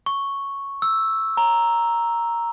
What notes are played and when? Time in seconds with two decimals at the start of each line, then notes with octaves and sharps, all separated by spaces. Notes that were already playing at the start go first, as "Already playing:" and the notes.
0.06 C#6
0.82 E6
1.37 A#5